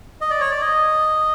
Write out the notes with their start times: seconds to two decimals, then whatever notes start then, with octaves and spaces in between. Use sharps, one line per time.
0.21 D#5
0.31 D5
0.40 C#5
0.51 D5
0.61 D#5